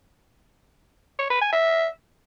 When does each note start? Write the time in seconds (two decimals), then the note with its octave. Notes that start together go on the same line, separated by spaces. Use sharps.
1.19 C#5
1.30 B4
1.41 G#5
1.53 E5